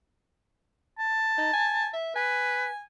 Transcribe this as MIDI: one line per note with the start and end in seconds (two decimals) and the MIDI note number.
0.99 1.90 81
1.38 1.50 63
1.53 1.88 80
1.93 2.14 76
2.15 2.67 71
2.15 2.81 80